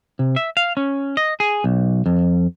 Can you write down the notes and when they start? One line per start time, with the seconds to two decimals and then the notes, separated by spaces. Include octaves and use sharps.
0.19 C3
0.36 E5
0.57 F5
0.77 C#4
1.17 D#5
1.40 G#4
1.64 B1
2.06 F2